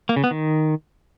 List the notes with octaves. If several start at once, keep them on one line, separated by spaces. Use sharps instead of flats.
A#3
C#3
B3
D#3